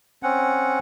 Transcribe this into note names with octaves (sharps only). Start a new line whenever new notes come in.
C4 C#4 F#5